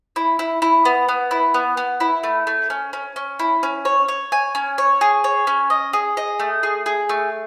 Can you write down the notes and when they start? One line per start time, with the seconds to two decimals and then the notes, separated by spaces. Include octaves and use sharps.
0.16 E4
0.39 E4
0.62 E4
0.85 B3
1.08 B3
1.31 E4
1.54 B3
1.77 B3
2.00 E4
2.23 A3
2.47 A3
2.70 C#4
2.93 C#4
3.16 C#4
3.39 E4
3.63 C#4
3.85 C#5
4.08 C#5
4.32 G#5
4.55 C#4
4.78 C#5
5.01 G#4
5.24 C#5
5.47 C#4
5.70 D#5
5.93 G#4
6.17 D#5
6.40 A3
6.63 G#4
6.86 G#4
7.09 A3